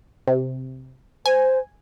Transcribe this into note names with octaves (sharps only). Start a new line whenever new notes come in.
C3
C5 G#5